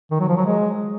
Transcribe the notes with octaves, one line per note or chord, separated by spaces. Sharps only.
D#3
F#3
F3
F#3
G#3